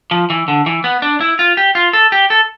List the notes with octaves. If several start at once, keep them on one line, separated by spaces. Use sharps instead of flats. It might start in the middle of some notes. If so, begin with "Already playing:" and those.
F3
E3
D3
E3
B3
D4
E4
F4
G4
F4
A4
G4
A4